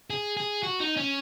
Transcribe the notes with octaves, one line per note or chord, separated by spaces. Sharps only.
G#4
G#4
F#4
D#4
C#4